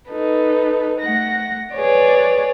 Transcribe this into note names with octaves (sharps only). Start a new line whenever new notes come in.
D#4 A4 B4
A3 F#5 A#6
G#4 B4 C#5 D5